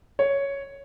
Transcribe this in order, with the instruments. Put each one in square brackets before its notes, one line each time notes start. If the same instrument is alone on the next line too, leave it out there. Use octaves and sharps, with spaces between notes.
[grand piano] C#5